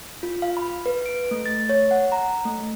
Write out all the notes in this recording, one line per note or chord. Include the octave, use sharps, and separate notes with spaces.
F4
F5
B5
B4
D7
A3
A6
C#5
F#5
A#5
A3